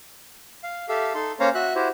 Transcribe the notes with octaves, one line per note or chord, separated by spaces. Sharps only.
F5
G4 A4 E5 F5
D#4 A4 C6
A#3 C#4 C5 C#5 F5 A#5
F#4 E5 F#6
E4 F#4 G4 C5